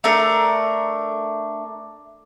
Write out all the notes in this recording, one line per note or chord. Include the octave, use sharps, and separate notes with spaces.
A3 D4 A#4